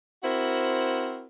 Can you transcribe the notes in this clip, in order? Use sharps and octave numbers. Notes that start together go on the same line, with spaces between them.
C4 E4 F#4 A#4 C5